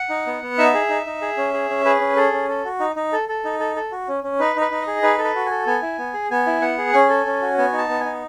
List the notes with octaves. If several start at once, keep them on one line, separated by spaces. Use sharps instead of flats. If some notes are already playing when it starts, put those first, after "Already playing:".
Already playing: F#5
D#4
B3
B3
D#4 E5
G#4
D#4
D#4
G#4
C#4
G#4
C#4
G#4 B4
C#4
G#4 A4
C#4
A4
F#4
D#4
D#4
A4
A4
D#4
A4
A4
F#4
C#4
C#4
D#4 B4
D#4
B4
D#4
D#5
G#4
D#4 B4
A4
B4
F#4
A4 G#5
B3 G#5
E4
B3
G#4
B3 G#5
E4
B3 F#5
G#4
C#4 G#5
A4
C#4
F#4
B3 G#5
D#4
A5
B3
D#4 G#5